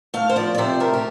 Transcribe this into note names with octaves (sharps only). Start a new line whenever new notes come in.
A3 F5
C5
F3 D5
D5
C3 C5
A3 A#4
G4